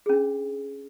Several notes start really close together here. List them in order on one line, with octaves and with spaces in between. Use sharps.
G#4 C#4 D4